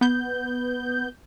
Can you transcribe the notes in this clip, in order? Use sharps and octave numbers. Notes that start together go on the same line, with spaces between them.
B3 G6